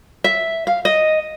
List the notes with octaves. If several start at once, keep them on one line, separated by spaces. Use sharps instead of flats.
E5
F5
D#5